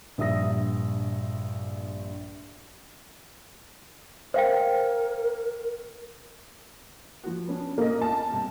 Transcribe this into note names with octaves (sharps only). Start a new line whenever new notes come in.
A#1 G2 E5 D#6 A#6
A#4 C5 F5 G5
F3 F#4
B3 C#4 D4
A#3 D#5
A5
C3 G3